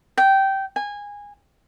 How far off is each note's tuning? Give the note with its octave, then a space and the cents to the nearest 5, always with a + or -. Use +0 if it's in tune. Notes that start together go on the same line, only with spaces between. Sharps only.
G5 -15
G#5 -20